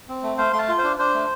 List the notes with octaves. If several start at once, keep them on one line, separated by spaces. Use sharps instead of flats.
C4
A3
A3 C5 F5
A3 C6
F5 A5
F4
C5 F5
D4
D4 C5
A3